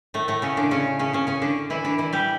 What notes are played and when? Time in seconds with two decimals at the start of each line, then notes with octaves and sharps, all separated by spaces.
0.14 A2 A3
0.28 A2 A3
0.42 C#3 C#4
0.57 D3 D4
0.71 C#3 C#4
0.99 C#3 C#4
1.13 C#3 C#4
1.27 C#3 C#4
1.42 D3 D4
1.70 E3 E4
1.84 D3 D4
1.98 E3 E4
2.13 G3 G4